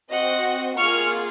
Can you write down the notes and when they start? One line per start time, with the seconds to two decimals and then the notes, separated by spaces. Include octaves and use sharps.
0.11 C4 F#4 D#5 F#5
0.78 A#3 F4 G#4 C#6 F6